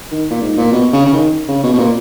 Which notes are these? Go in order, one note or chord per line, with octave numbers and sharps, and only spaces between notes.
D#3
A#2
G#2
A#2
B2
C#3
C#3
D#3
C#3
B2
B2
A#2